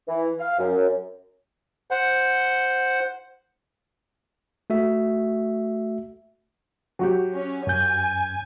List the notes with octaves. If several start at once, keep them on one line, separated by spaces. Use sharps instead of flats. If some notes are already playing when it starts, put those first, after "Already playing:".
E3
F5
F#2
C5 F#5
A3 F#4 E5
F#3 F#4 G4
C#4
F#2 G#5 G6